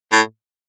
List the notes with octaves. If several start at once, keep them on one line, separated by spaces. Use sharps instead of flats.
A2